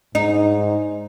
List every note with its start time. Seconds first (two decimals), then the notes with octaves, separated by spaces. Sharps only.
0.15 G#2 D#4